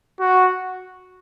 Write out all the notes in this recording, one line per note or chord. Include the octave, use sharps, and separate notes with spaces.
F#4